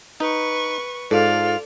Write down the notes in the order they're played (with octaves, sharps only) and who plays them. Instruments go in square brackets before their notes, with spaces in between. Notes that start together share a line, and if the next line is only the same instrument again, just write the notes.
[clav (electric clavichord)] D#4 [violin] B4 C#6
[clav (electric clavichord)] G#2 [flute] F4 [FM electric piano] A4 [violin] D5 F7